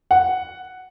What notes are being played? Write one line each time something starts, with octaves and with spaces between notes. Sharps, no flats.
F#5